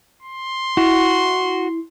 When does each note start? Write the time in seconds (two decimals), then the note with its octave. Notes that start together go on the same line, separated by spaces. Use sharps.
0.23 C6
0.77 E4 F#4